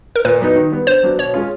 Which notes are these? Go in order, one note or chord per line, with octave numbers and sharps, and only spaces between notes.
A#4
A#2 B4
F#3 B3 D#4
D#3
G3 B3
D3 C5
F#3 B3 D4 F#4
B2 C#5
G#3 C#4 F4